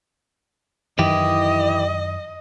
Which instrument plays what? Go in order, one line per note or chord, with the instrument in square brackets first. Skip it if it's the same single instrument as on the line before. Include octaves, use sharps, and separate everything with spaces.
[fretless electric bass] F#2 D#3 [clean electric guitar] E3 E4 G4 [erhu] D#5